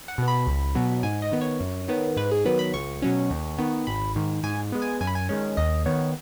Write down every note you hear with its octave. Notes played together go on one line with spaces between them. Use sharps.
F#5
B2 B3
B5
C#2
B2 F#3 B3
G#2 G#5
D#5
D#3 B3
C#5
F#2
D#3 B3
G#2 B4
G#4
D#3 F#3 B3 B4
B5
C#2 C#6
B2 F#3 C#4
D#2
D#3 B3
G#1 B5
G#2 D#3
G#2 G#5
G#3 B3
G#5
F#2 G#5
B5
G#5
D#3 G#3 C#4
D#2 D#5
D#3 B3 C#5